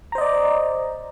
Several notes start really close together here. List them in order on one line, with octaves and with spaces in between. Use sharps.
A#5 C5 D#5 D5